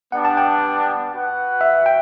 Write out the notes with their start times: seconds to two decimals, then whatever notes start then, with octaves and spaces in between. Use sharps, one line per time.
0.12 G3 B3 D4 F#5
0.25 A5
0.37 G5
1.12 F#4 B4 F#5
1.61 E5
1.86 G5